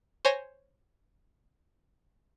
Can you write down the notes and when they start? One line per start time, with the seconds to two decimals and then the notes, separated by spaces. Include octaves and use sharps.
0.25 C5 C#5 G#5 A#6